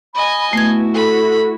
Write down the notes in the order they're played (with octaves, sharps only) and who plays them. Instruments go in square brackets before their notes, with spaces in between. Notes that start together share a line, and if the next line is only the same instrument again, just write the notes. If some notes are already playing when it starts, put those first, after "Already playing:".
[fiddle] D#5 G#5 [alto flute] B5
[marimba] A3 G#6 [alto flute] B3 [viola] E4 F#4
[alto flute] A4 [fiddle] B5